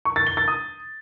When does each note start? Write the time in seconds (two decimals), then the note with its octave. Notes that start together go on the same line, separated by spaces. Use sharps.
0.05 C#6
0.16 A6
0.27 G7
0.37 A6
0.48 D#6